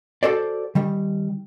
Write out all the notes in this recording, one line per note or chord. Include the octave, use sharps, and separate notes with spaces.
F#4 A4 C5 D5
D#3 G3